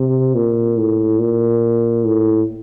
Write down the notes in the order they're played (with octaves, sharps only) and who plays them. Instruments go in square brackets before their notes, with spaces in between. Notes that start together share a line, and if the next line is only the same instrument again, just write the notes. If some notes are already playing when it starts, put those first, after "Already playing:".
Already playing: [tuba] C3
A#2
A2
A#2
A2